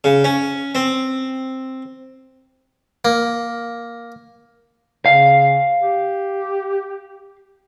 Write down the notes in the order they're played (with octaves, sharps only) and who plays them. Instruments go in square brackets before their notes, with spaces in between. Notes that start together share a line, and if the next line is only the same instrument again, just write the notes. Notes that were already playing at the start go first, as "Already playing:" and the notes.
[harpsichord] C#3
C#4
C4
A#3
[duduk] C#3 [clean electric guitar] F5
[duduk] G4